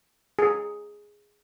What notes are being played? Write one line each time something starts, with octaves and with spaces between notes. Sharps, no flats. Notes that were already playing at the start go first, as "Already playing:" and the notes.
G#4